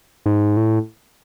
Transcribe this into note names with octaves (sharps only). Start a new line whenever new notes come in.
G#2
A2